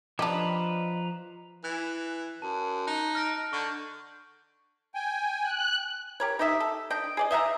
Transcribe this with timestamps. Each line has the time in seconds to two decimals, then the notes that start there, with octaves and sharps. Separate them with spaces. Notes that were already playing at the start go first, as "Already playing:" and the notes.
0.19 F3 D4 G4 B4 D#5 A#5
1.64 E3 F#6
2.42 F#2 A5
2.87 D#4 F#6
3.15 F6 A#6 D7
3.53 D3 C#6 G6
4.94 G5 G#5
5.43 F#6
6.20 G4 A#4 C#5
6.39 D#4 G4 D#5 E5
6.60 A4
6.90 D4 D#5 G5
7.17 G#4 D5 D#5
7.31 D#5 E5 F#5 A#5